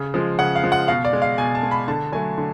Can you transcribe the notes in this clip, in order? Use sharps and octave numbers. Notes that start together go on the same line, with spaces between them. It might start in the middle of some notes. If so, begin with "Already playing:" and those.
Already playing: C#3
F3 G#3
C#3 F#5
F5
F3 G#3
F#5
B2 F5
D5
G#3
F5
B2 G#5
A5
G#3
B5
D3 A5
F#3 A3 G#5
D3